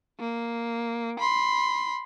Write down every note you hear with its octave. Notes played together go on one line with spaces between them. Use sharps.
A#3
B5 C6